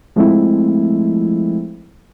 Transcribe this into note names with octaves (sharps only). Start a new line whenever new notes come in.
F3 G#3 A3 C4 E4